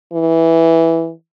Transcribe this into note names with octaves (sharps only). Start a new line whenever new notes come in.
E3